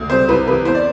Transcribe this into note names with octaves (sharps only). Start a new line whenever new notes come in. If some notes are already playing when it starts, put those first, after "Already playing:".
Already playing: D2
C3 G3 C5
C2 B4
C3 E3 B4
E2 C5
D5